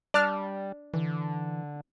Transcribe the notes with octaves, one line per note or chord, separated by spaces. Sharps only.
G3 D4 D5 A5 F6
D3 E3